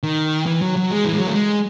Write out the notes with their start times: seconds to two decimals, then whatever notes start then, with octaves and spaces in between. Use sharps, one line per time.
0.03 D#3
0.46 E3
0.62 F#3
0.76 F#3
0.91 G#3
1.05 E3
1.13 G#3
1.19 F#3
1.27 A3
1.35 G#3